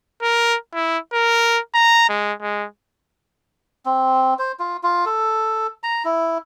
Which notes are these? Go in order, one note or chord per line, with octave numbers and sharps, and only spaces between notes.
A#4
E4
A#4
A#5
G#3
G#3
C4
C5
F4
F4
A4
A#5
E4